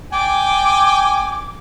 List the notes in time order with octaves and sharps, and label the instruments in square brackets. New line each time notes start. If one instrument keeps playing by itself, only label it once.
[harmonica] G5 G#5 [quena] D6